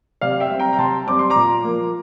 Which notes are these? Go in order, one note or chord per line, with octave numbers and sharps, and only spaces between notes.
C3 D5 F5
E5 G5
G3 C4
G5 A#5
A#5
C3 A5 C6
G3 C4 D6
C6
A#5 D6
A#2
F3 A#3